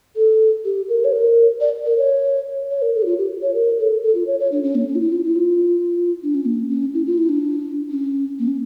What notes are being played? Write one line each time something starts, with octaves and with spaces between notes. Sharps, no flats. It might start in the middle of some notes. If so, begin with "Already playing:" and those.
A4
G4
A#4
C#5
A#4
D5
A#4
C#5
C#5
A#4
A4
G4
F4
G4
C#5
A#4
A4
A4
F4
C#5
C#5
D4
C#4
A#3
C#4
F4
E4
F4
E4
F4
D4
C#4
A#3
C#4
E4
F4
E4
D4
C#4
A#3
C#4